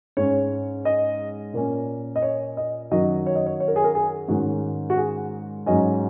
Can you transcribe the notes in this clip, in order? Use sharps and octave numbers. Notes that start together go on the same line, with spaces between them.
G#2 G#3 C#4 C#5
D#5
A#2 A#3 C#4
D#5
C#5
D#5
F#2 D#3 F#3 D#5
C#5
D#5
C#5
C#5
A#4
G#4
A#4
G#4
G#2 D#3 G#3 C#4 F#4
F#4
G#4
G#2 F#3 C#4 D#5